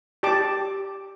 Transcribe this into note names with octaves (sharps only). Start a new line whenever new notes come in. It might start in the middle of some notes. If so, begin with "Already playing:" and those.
G4 D5 A5 D6